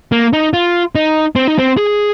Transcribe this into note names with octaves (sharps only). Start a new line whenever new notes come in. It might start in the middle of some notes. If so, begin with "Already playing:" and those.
A#3
D#4
F4
D#4
C4
D#4
C4
G#4